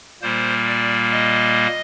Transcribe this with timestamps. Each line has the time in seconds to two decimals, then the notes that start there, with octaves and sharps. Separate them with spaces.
0.22 A#2 G3 A#3 C5
0.67 D5
1.12 D#5